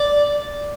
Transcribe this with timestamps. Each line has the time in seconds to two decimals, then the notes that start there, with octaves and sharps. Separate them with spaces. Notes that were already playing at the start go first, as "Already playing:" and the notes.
Already playing: D5